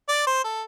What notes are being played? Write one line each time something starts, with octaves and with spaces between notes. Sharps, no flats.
D5
C5
A4